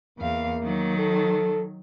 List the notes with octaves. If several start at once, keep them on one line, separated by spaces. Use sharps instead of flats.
E2 A#3 F5
D#3 F#3
A4